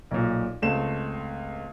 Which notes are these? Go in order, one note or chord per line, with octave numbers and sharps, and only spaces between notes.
B1 A#2
C#2 A3 C4 E7